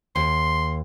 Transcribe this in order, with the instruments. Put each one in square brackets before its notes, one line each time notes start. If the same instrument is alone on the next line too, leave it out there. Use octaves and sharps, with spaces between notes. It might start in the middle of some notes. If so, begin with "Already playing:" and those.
[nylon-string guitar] D#2 [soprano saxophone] C6